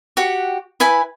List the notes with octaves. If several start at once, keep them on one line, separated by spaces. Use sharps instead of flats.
F#4 G4 F#5
E4 B4 G#5 B5